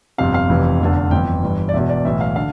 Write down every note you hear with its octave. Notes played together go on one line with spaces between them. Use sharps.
G1 F2 C3 F5
F5
F1 F2 C3 E3
F1 E2 D3
G1 F2 E3 G5
G1 G2 E3
D5
E1 E2 B2 E5
D5
B1 A2 E3 E5
F5
D3 F5